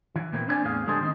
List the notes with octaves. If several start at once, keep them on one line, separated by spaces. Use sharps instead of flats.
E3
A#2 E3 A#3 C4 E4
C4 D4 E4 C5 D5 G#5
E2 A2 C4 G#4 F5
D3 G3 G#3 G#4 A4 C5
D#3 C4 D#4